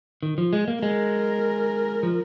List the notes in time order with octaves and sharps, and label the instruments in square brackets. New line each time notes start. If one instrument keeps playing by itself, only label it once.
[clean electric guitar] D#3
F3
G#3
A#3
[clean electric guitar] G#3 [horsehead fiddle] A#4
[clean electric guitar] F3